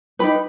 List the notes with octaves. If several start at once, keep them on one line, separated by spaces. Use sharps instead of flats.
D#4 G4 B4 B5